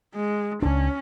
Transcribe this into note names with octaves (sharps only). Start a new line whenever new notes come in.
G#3
C#2 C#4 D4